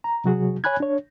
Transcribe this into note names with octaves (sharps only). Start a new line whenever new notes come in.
A#5
C3 F#3 F#4 G#4
C#5 G#5 B5 F#6 G#6
D4 C#5